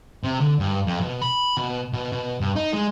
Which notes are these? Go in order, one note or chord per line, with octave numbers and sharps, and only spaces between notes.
C3
D3
G2
F2
B2
B5
B2
B2
B2
G2
D#4
G#3